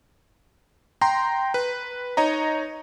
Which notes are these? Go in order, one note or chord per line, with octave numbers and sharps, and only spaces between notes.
G5 A#5 C6
B4
D#4 C#5 D#5 A#5